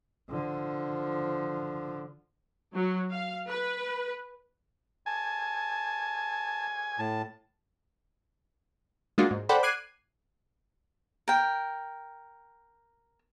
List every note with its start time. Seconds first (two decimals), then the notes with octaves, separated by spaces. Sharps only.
0.30 D3 F3
2.74 F#3
3.12 F5
3.49 B4
5.06 G#5 A5
6.98 A2 A5
9.18 G#3 A#3 D4 F4 F#4
9.31 G#2
9.49 A4 C5 D5 F#5 G5 B5
9.63 D6 F#6 G#6 C7 D#7
11.28 A#4 G5